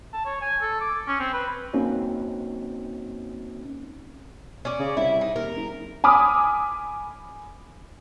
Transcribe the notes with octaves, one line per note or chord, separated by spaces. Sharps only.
A5
C#5
G#5
A4
D6
C#4
C4
B4
A#3 C4 C#4 D#4 F#4
C#4 D5
C#3
C2 E4
D#4
D#2 A#4
F#1
G#5 B5 D6 D#6 F6